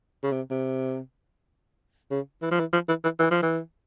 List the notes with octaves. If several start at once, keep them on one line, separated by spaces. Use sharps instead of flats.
C#3
C3
C3
C#3
E3
F3
E3
F3
E3
E3
E3
F3
E3